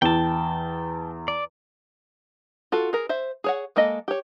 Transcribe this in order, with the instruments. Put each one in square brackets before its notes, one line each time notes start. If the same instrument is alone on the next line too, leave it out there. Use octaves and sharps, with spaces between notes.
[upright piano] E2 [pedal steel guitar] G5 A5
[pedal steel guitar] D5
[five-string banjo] F4 F#4 A4
G#4 A#4
C5 E5
G#4 C#5 F#5
G#3 A#3 A4 D#5
G4 C#5